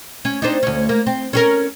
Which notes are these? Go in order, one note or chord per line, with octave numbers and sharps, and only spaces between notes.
C#4
C4 D4 D#4
D2 C#4
A#3
C4
C#4 G#4 A#4